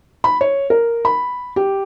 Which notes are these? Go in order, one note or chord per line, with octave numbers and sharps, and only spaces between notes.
B5
C#5
A#4
B5
G4